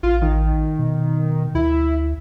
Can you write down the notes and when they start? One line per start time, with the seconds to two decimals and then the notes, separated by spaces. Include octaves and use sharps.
0.03 A1 F4
0.22 D#3
0.79 B2
1.55 D2 E4